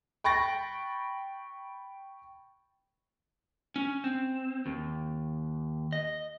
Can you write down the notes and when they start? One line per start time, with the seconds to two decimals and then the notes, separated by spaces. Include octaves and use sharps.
0.24 G5 B5 C#6 A6 A#6
3.76 C#4
4.04 C4
4.66 D#2
5.92 D#5